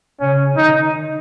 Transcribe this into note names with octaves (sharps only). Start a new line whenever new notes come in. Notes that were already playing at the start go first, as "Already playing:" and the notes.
C#3 C#4
D#3 D#4